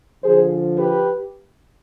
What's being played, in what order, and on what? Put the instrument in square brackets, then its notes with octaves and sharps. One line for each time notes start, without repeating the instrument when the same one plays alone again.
[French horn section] D3 F3 G#4 C5
G4 B4